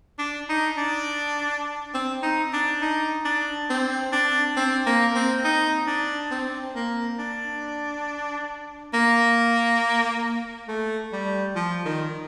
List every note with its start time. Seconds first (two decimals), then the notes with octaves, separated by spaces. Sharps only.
0.19 D4
0.49 D#4
0.77 D4
1.94 C4
2.23 D#4
2.53 D4
2.81 D#4
3.25 D4
3.70 C4
4.13 D4
4.57 C4
4.86 A#3
5.15 C4
5.44 D#4
5.87 D4
6.31 C4
6.75 A#3
7.19 D4
8.94 A#3
10.68 A3
11.13 G3
11.56 F3
11.85 D#3